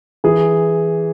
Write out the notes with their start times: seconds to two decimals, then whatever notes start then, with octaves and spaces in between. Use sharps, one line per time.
0.24 E3 G#4